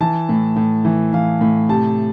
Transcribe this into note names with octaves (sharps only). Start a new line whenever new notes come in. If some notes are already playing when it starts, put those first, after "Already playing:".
E3 A5
A2
A2
E3
E3 F5
A2
C3 A5